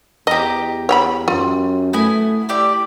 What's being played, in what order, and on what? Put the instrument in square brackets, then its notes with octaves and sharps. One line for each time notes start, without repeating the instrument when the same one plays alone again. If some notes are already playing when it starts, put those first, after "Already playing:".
[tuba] E2 [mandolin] G4 A#5 [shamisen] D#5
[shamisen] C#5 G5 B5
[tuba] F#2 [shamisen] F4
[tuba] A3 [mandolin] B3 E4 G#5
[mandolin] E4 G4 D5